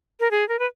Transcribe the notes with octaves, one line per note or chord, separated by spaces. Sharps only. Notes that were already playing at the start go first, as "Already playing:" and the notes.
A#4
G#4
A#4
B4